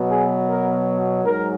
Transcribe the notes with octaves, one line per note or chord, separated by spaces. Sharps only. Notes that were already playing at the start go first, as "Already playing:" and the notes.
Already playing: B2 F#3 B3
G#4
A#4
G#2 F#3 A#4